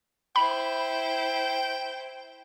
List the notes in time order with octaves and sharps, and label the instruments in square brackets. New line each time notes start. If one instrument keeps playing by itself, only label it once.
[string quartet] E4 C5 [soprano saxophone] G5 [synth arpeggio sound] B5